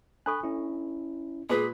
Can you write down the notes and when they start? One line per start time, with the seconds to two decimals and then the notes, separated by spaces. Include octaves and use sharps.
0.26 D4 A4 G#5 B5 C#6 F#6
0.43 C#4 E4
1.50 A#2 G#4 B4 D6 D#6 B6